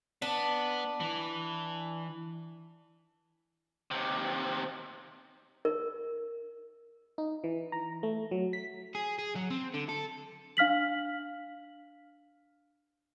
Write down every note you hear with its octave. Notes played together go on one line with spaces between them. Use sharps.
B3 D4
E3
D#2 C3
A#4
D#4
E3
A#5
A3
F#3
B6
G#4
G#4
F#3
C4
D3
A4
D4 F5 F6 B6 F#7